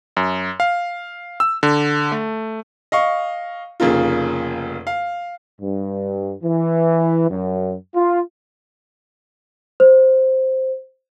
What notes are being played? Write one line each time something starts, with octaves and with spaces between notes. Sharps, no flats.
F#2
F5
E6
D3
A3
D#5 F5 C#6
F1 C#3 A#3 F4
F5
G2
E3
F#2
F4
C5